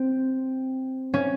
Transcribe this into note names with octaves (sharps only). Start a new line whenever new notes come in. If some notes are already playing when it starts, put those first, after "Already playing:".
Already playing: C4
C#4